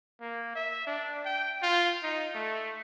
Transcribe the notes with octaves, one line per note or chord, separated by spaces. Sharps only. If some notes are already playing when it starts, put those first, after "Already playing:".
A#3
E5
D4
G5
F4
D#4
A3